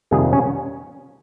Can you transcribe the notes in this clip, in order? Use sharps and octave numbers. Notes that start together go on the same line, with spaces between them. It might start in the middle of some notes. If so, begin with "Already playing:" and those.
F2 C3 D#3 G3 A#3 G#4
C#4